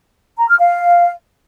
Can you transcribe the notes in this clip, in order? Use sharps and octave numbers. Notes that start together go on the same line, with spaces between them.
A#5
F6
F5